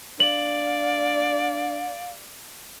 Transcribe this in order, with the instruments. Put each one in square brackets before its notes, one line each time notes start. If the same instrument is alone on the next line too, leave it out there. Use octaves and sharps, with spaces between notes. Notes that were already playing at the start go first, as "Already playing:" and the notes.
[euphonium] D4 [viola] D5 [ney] F5 [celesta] F#7